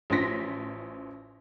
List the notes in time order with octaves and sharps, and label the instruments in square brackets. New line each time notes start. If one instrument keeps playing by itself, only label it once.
[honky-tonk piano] A1 F3 C#4 C6 A#6 B6